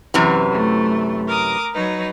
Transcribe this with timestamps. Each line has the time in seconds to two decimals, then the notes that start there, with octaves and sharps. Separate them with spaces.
0.14 F#2 C3 E3
0.51 A3
1.28 A#4 D6 D#6
1.72 F#3 D#4 B4